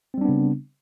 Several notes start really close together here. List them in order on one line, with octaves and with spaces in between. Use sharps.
C4 G3 D4 B3 C#3